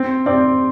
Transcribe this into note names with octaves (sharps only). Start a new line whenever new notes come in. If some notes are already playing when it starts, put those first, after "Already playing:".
Already playing: C4
C4 D5